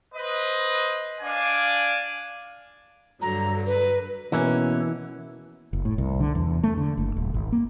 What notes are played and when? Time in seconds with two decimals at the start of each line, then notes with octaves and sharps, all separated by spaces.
0.15 B4 C5 D#5
1.21 D4 D5 F5 G#5
3.22 G2 D3 F#3 A#5
3.67 B4
4.32 B2 E3 A#3 C#4 G#5
5.73 F#1
5.85 A2
5.98 C2
6.20 D3
6.35 E2
6.63 A3
6.77 D3
6.97 F#1
7.16 D#1
7.34 G#1
7.52 A#3